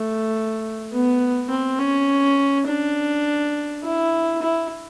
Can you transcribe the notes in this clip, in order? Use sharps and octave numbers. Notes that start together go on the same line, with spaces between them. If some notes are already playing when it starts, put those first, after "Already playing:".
Already playing: A3
B3
C4
C#4
D4
E4
E4